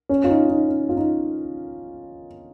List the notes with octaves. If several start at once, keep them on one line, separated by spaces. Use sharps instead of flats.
C#4
F4
D#4
D#4
C#4
F4
D#4